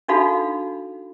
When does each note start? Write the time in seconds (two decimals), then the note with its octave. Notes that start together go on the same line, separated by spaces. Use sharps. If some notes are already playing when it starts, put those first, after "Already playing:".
0.08 D4 D#4 F#4 A4 F5 B5